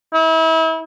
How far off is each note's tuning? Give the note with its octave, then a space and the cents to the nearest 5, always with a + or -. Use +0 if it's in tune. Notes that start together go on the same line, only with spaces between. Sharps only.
E4 -35